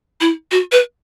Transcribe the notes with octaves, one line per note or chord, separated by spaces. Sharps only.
E4
F#4
B4